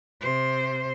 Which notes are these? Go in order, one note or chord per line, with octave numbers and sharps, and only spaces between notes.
C3 C5